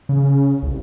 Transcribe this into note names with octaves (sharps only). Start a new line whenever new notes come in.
C#3
C2